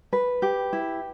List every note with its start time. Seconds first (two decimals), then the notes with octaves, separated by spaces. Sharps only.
0.13 B4
0.42 G4
0.73 E4